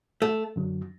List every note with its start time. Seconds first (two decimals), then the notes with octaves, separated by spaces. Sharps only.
0.22 A3
0.56 F#2 D3 F#3